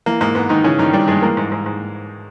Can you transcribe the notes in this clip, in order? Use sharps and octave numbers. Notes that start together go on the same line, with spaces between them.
E3 A#3
G#2 A#3
G#2 B3
G#2 D#3 D#4
C#3 E3 C#4
G2 D#3 D#4
E3 G3 G4
G2 G#3 G#4
E3 A#3 A#4
G#2
G#2
G#2